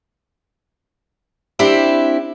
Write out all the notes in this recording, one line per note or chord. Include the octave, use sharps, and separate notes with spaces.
C4 D4 E4 G4